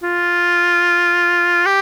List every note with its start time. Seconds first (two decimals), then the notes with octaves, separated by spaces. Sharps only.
0.03 F4
1.66 G4